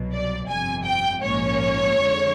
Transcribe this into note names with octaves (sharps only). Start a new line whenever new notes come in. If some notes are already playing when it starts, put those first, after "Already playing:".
Already playing: C2 B2 F#3
D5
G1 F2 C3 G#5
G5
A#1 G#2 F3 A#3 C#4 C#5
F2 D3 F3 G#3